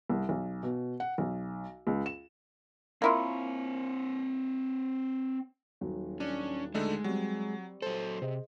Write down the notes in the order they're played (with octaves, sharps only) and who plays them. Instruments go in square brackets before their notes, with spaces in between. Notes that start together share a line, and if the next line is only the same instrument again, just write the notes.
[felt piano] C2
B1
B2
F#5
B1
C#2
E7
[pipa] A#3 E4 F4 [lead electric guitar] C4 C#5
[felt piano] D#1 F#3
[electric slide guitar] C#4 [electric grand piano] D4
[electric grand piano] D3 A3 D#4 [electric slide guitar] G#3
[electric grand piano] F#3 [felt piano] G3 C4
[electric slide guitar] F#3 A4 [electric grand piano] C5
[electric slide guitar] C3 [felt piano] G#4 C5 D#5